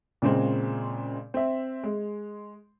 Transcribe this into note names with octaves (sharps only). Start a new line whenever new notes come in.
A#2 C#3 G#3 C4
C4 E5
G#3